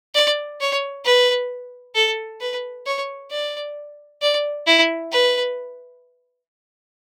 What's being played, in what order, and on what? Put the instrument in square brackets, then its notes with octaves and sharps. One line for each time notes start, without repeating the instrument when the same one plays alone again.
[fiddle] D5
C#5
B4
A4
B4
C#5
D5
D5
E4
B4